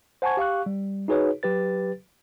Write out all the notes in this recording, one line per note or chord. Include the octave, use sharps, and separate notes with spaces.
C5 F#5 G#5 A5 C#6 G#6
G4 F5 C#6 F#6
G3
D#4 F#4 G#4 B4 C#5
F#3 G4 B4 A6